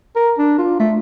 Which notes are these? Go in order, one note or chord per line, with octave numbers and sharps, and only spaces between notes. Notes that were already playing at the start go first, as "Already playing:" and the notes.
A#4
D4
F4
A3